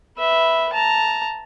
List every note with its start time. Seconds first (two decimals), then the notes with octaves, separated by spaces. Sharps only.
0.18 B4 E5
0.73 A5 A#5